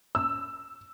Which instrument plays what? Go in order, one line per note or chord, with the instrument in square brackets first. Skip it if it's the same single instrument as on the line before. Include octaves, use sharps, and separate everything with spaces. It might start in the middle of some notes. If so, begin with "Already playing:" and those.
[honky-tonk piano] E6